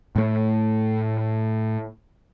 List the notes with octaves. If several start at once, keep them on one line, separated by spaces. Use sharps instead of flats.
A2 A3